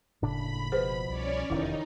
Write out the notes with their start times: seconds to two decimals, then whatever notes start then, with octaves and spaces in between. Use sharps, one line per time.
0.22 F#1 A2 C#3 D4 B5
0.72 B2 F3 G#4 B4 C5
1.09 C2 C#4 C#5 D5
1.50 F1 E2 D#3 D#4 E4